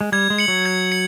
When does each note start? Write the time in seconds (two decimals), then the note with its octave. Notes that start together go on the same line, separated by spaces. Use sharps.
0.01 G#3
0.12 G3 G#6
0.30 G#3
0.38 C#7 F#7
0.48 F#3
0.66 G#6
0.92 C#7